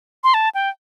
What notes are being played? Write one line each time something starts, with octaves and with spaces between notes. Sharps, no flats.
C6
A5
G5